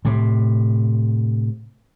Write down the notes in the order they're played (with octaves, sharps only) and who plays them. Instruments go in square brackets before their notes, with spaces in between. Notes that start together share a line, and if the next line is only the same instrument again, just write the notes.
[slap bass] A2 C3